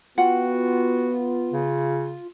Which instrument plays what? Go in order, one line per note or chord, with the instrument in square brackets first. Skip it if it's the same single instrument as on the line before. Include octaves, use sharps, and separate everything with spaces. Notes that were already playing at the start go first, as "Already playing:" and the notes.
[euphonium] B3 [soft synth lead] F4 [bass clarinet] F#4 [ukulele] F#5 G5
[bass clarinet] C#3